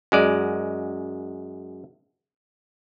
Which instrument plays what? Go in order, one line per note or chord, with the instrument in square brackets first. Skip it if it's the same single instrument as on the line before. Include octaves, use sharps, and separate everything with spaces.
[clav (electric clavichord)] F#2 G#3 D5